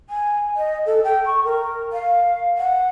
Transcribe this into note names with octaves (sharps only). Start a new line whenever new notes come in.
G#5
D#5
A4
G5
C#6
A#4
F5
F#5